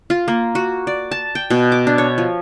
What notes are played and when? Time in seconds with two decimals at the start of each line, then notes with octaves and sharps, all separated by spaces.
0.10 F4
0.28 A#3
0.55 F#4
0.87 D5
1.11 A5
1.35 G5
1.50 B2
1.72 D6
1.87 D4
1.98 C#5
2.18 F3